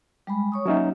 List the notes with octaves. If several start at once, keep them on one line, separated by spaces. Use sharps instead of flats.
G3 G#3 B5
C#5 C#6 D#6
F#3 A#3 C#4 D#4 E5